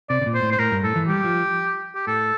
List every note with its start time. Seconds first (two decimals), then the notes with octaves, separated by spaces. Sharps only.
0.10 C3 D5
0.21 C3
0.26 A#2
0.35 C5
0.42 A2
0.52 C5
0.59 A2 A#4
0.71 G2
0.83 A2 A4
0.96 E3
1.08 G3 G4
1.24 F3
1.95 G4
2.07 A2 A4